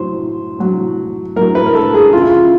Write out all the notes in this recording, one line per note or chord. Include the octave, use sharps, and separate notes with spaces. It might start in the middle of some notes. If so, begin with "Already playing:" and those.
Already playing: A2 F#3 C5
A2 F#3
A2 F#3 A#4
B4
A#4
A4
G#4
C#3 E3 F4
E4
F4